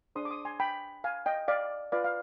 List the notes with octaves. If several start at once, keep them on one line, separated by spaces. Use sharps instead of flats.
D4 G#4 C5 C6 D#6
D6
C6 D#6
G#5 C6
G5 B5
F5 G#5
D#5 G5
D5 F5
F4 B4 D5 F5
F5